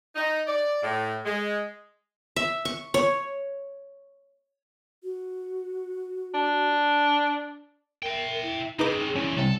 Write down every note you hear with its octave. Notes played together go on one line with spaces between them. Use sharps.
D#4
D5
A2
G#3
E5
C#6
C#5
F#4
D4
A#4 E5 G5
E4
C#3 C4 D#4 G#4 B4 D6
A#2 E3 C#4 E4
C2 C3 A4